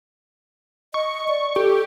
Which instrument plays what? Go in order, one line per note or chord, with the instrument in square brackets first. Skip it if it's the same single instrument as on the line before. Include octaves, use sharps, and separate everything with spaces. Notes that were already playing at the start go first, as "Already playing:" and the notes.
[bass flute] D#5 [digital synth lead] C#6
[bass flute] D5
[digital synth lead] G4 [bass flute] A4